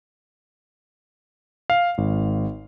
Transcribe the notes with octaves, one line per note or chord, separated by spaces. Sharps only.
F5
G#1